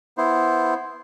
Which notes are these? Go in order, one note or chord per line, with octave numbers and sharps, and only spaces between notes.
B3 E4 C5